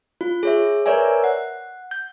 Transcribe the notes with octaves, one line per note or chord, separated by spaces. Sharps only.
F4
G#4 C#5 E5
A#4 B4 C#5 D5 E5 G#5
F#5
G6